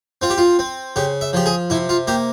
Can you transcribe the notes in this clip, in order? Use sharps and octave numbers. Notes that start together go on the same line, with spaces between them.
C4 F4
G4
F4
C4
C#3 G4
E5
F3 G4
G#4
C3 E4
F4
A#3 G4